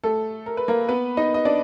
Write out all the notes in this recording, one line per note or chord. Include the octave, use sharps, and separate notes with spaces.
A3 A4
A#4
B4
A#3 A#4
B3 B4
D#4 D#5
D#5
D4 D5